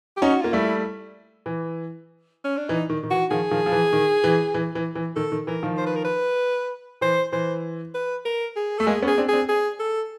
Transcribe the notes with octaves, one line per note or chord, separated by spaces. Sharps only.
G4
C#4 D#4 F#4
A#3 F4
G3 A3 E4
E3
C#4
D4
E3 D#4
D#3
D#3
E3 F#4
D#3 F3 G#4
D#3 F3
F3
E3
D#3
E3
E3
E3
E3
D#3 A4
D#3
E3 A#4
D#3 F3
C5
B4
A#4
B4
E3 C5
E3 C5
B4
A#4
G#4
A3 A4
G#3 A#3 G#4
B3 C#4
G#4
C4 D4
C4 D4 G#4
G#4
A4